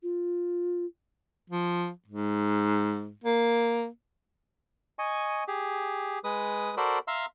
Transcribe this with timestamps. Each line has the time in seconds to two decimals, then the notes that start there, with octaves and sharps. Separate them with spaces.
0.03 F4
1.50 F3
2.07 G#2
3.24 A#3
4.99 D#5 G#5 C#6
5.48 G4 G#4
6.24 G#3 B4 D#6
6.77 F#4 A4 A#4 C5 D5 B5
7.08 E5 F5 A#5 C6 E6